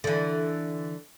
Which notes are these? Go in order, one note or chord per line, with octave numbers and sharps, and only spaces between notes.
D3 E3